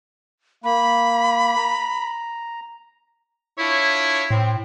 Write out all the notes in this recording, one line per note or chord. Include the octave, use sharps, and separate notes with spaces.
A#3 B5
A#5
D4 E4 F4 C#5
A2 C4